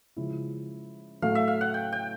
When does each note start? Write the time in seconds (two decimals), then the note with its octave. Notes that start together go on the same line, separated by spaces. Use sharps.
0.17 C#3 F3 G#3 C#4 E4
1.22 A2 F#3 A3 F5
1.35 E5
1.48 F5
1.61 F#5
1.74 G5
1.92 G5